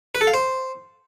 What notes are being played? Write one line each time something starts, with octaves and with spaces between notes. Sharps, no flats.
B4
A4
F5
C5